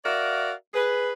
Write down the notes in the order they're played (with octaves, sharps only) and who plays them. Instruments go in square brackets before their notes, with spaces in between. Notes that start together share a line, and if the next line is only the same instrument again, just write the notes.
[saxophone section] F#4 A#4 D5 E5 F5
G#4 B4